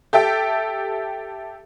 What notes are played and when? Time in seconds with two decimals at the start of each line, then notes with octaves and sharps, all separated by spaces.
0.13 G4 A4 E5 G5